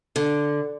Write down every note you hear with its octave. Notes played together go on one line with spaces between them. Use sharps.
D3